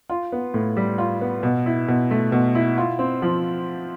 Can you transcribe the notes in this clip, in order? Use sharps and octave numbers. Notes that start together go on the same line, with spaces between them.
F4
B3
A2
G3
F4
B3
B2
E4
B2
A3
B2
E4
F4
C4
F3